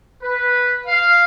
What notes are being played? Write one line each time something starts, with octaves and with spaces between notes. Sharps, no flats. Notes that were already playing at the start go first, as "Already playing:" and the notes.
B4
F5